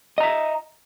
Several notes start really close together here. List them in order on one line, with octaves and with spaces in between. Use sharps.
D#5 A#5 E5